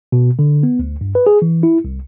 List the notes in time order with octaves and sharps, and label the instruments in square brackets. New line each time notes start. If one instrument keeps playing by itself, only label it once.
[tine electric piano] B2
D3
B3
D2
G2
B4
G#4
E3
E4
C2